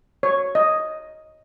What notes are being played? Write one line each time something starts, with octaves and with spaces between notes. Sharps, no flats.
C#5
D#5